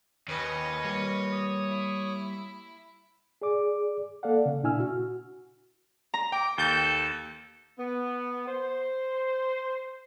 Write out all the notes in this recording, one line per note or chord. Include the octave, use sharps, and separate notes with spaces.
D#2 C#4 B4 D#5
G3 A#3 C#5
D#6
E4
G#4 D5 D6
A#3 A4 D5 F5 F#5
C#3
A#2 D4 E4 G#5 E6 F6
F#4
A#5
G5 D6
D#2 A4 G6 A6
B3
C5